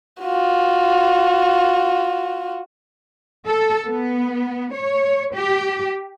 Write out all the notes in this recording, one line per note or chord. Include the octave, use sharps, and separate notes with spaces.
F4 F#4
A4
B3
C#5
G4